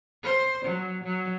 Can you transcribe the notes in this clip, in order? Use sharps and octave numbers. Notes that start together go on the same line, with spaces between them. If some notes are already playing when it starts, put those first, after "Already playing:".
C5
F#3
F#3